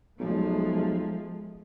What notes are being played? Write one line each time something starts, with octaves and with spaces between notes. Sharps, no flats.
B1 F3 G#3 A3